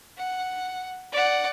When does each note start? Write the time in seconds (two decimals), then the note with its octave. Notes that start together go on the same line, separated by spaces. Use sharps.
0.17 F#5
1.12 D5 F#5